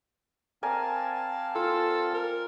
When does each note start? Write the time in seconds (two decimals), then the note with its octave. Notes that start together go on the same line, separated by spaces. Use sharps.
0.63 C4 A#4 D5 F5 G#5 A5
1.55 F4 A4
2.14 A#4